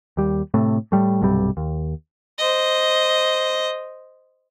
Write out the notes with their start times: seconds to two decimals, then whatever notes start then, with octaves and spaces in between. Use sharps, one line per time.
0.17 D#2 G3
0.54 A2 C3 A3
0.92 A2 G3 A3
1.22 B1 G2 C3 G3
1.57 D#2
2.39 C5 D#5